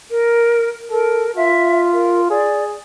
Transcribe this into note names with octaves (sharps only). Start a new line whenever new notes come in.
A#4
A4 A#4
F4 E5
A#4
G#4 D5